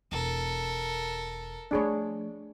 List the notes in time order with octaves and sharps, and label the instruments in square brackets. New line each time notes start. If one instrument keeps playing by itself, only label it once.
[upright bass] E1 [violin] A4 A#4
[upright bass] F3 A3 [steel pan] D4 G#4 C#5